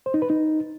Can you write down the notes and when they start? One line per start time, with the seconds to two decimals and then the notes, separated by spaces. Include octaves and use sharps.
0.06 C5
0.14 D#4
0.22 B4
0.30 D#4